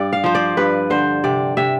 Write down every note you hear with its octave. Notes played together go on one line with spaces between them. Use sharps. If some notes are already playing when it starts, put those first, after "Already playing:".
Already playing: G2 D5
F5
F3 C5
D5
G2 B4
D3 C5
C3 D5
C3 E5